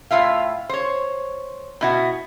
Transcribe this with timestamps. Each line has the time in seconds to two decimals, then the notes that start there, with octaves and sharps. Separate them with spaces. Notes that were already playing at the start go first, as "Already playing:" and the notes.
0.11 A2 F4 E5 F5
0.69 C5 C#5
1.81 B2 E4 F#4